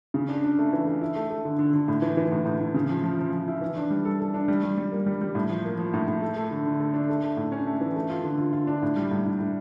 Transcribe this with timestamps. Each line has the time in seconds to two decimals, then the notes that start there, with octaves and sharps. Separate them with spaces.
0.14 C#3
0.29 D4
0.44 D4
0.59 A3
0.73 E3
0.87 A3
1.01 E4
1.16 A3
1.30 A3
1.45 D3
1.59 D3
1.73 D3
1.88 A2
2.02 E3
2.17 E3
2.32 A2
2.45 A2
2.60 A2
2.74 C#3
2.90 F3
3.04 F3
3.19 F3
3.33 F3
3.48 E4
3.61 E3
3.77 D4
3.90 G3
4.05 A4
4.20 A4
4.34 D4
4.48 G3
4.63 G3
4.77 G3
4.92 A#3
5.06 G3
5.21 G3
5.35 A2
5.50 F3
5.65 A#3
5.78 F3
5.94 A2
6.08 A2
6.22 A3
6.36 A3
6.51 D3
6.65 D3
6.80 A3
6.94 D4
7.09 A3
7.23 A3
7.37 A2
7.52 C#4
7.66 A3
7.81 E3
7.96 A3
8.10 F4
8.24 D3
8.38 F4
8.53 F4
8.67 D4
8.83 A2
8.96 G3
9.11 A2
9.25 A2
9.40 A2